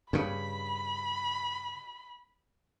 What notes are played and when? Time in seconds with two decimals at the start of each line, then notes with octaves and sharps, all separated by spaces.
0.13 G2 C#3 B5